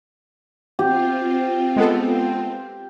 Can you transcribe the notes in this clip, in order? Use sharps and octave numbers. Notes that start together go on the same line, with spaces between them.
C4 F4 G4
G#3 B3 A4